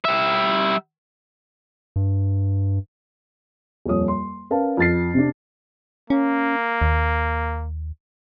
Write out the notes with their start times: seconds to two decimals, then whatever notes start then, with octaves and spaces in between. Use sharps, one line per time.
0.05 G3 E5
1.96 G2
3.86 D#1 F2 C#5 D#6
4.08 C6
4.51 C#4 A#4 B4 F5 A5
4.77 F2 F6 A6 C7
5.14 C3 D4
6.10 A#3 C#4
6.82 D#2